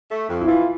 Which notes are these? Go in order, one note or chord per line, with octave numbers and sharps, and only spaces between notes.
A3
F2
E4
E3 F4